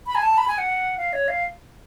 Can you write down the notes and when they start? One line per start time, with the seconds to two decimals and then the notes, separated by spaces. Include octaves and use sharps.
0.07 B5
0.15 G#5
0.22 A5
0.38 B5
0.48 G#5
0.58 F#5
0.98 F5
1.13 C#5
1.28 F5